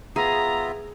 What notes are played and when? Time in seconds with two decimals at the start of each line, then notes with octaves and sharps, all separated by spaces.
0.16 B3 F4 G#4 E5 A#5